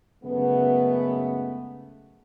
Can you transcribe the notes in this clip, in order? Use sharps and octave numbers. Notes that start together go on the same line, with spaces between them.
F#2 C#3 G#3 A3 B3